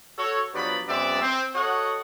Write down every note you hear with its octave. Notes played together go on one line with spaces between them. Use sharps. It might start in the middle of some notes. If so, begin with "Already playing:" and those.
F#4 A4 C#5
G2 F3 F#3 B3 D5 B5
F#2 G#3 B3 C4 D5 E5
C4
F#4 A4 C#5 D#5 F#5